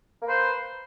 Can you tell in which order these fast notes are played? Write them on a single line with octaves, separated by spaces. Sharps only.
A#3 B4 C5